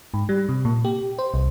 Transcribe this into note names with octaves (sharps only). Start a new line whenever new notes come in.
G#2
G3
C3
A#2
G4
C5
C2